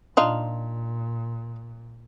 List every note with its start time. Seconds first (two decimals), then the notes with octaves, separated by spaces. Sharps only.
0.17 A#2 D4 D#4 F4